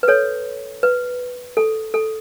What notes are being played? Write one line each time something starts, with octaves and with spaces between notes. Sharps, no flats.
B4
A4 C#5
B4
A4
A4